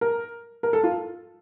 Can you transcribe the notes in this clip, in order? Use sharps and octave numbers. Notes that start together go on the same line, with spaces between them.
A#4
A#4
A4
F4